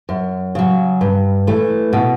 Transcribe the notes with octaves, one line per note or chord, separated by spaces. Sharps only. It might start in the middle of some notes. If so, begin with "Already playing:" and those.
F#2
C#3 F#3
G2
E3 A3
B2